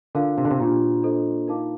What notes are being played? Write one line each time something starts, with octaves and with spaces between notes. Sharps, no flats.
D3 D4 F4 A#4 F5
C3
D3
C3
A#2 D4 G4 C5
D4 A4 C5 D#5
D#4 A#4 F5 A5 D6